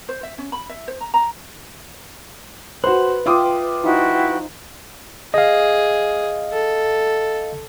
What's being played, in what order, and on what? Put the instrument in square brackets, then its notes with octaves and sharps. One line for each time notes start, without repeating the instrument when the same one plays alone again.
[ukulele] C5
E5
C#4
B5
E5
C5
A#5
A#5
[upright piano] F#4 C5 [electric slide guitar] B4 [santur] C6
[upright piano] F4 D6 D#6 [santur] E5 G5 C6
[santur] F3 D#4 [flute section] E4 F#4 G5
[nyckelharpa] G#4 [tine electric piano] D#5 F5
[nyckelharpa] A4